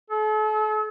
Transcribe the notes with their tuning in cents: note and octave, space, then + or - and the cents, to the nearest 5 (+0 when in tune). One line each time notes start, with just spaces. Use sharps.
A4 -40